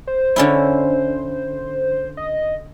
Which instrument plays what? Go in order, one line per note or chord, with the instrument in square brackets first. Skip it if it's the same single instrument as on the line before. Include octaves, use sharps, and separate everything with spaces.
[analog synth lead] C5
[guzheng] D3 C#4 E4
[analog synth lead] D#5